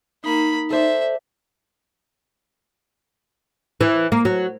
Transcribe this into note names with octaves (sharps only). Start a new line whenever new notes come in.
A#3 D#4 B5
A4 C5 D5 E5
E3
A#3
F#3